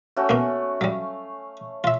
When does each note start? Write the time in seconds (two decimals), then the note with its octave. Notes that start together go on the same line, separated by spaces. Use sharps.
0.16 A3 C#4 F#4
0.29 A#3 B3
0.81 F#3 G3 F5
1.84 F4 E5